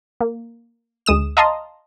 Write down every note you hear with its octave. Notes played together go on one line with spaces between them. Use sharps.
A#3
D2 G#3 D#6 E7
D#5 F5 A5 A#5 C6 D#6